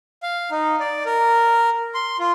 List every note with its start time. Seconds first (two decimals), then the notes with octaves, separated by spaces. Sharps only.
0.23 F5
0.51 D#4
0.80 D5
1.06 A#4
1.95 C6
2.19 F4